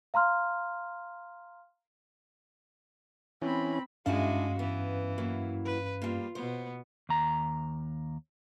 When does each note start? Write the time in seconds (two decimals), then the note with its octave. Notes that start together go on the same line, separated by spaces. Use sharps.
0.14 F5 A#5 C6 F6
3.42 E3 C4 C#4 B5
4.06 G2 G#3 C#4 D4 E4 F#4 G#4 F5
4.59 E3 B3
5.18 F#3 A#3 E4
5.65 B4
6.02 G3 A#3 F4
6.35 B2 B3 C5
7.09 D#2 A#5